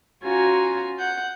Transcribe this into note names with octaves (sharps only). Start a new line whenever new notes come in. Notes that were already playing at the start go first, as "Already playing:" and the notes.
C#4 F4 F#4 G#5 A#5
F#5 G6